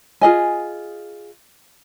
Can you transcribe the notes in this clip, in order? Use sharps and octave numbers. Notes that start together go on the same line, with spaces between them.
F4 G#4 D#5 G#5